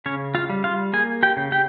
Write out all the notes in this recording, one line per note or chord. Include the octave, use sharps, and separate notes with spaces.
C#3 C#4 C#5
F4 F5
G3
F4 F5
A#3 G#4 G#5
G4 G5
C#3
G4 G5